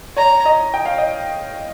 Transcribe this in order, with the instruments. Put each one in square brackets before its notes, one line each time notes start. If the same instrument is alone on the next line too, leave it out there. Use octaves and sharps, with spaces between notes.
[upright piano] C#5 [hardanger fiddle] A#5
[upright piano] D#5
G5
F5
D#5